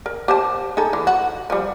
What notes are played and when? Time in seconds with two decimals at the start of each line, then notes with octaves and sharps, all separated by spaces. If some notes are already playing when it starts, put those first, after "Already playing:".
0.06 A#4
0.28 G4 C5 A5
0.77 D#4 G#4 A4
0.93 E3
1.07 F#4
1.50 F3 G3